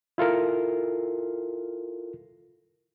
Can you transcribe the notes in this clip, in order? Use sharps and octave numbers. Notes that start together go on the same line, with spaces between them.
E4 F4 A4 A#4